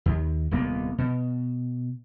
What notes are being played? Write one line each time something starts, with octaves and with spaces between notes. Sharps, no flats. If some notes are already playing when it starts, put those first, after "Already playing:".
D#2
D#1 C2 A#3 B3
B2